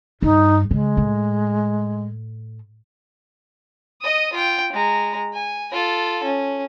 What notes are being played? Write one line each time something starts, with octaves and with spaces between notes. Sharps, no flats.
G2 D#4
C#3 G#3
A2
D#5 D#6
F4 G5
G#3 A#5
G#5
F4 A4
C#4